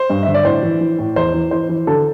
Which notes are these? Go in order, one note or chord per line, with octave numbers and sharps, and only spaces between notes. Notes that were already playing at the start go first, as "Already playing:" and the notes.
Already playing: C5
G2
D3 E5
D5
A2 C5
E3
E3
A2
E2 C5
E3
E3 C5
E3
D3 A4